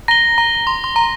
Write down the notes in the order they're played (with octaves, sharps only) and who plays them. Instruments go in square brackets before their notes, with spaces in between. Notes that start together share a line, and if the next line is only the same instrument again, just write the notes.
[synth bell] A#5 [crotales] A#6 G7
[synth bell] A#5
C6
C6
A#5